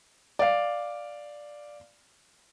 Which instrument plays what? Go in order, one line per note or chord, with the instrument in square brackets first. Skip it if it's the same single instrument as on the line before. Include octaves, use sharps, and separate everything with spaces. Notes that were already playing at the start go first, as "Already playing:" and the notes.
[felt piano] D5 F5